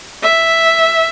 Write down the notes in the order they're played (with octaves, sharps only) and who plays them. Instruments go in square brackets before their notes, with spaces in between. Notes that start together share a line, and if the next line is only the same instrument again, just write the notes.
[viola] E5